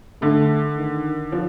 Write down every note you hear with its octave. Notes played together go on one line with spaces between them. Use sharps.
D3 A3
D#3
F3